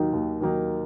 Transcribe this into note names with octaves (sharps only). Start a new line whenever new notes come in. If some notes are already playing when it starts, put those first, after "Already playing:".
Already playing: D#2 D#3 F#3 A#3 D#4
D#2
D#3 F#3 A#3 D#4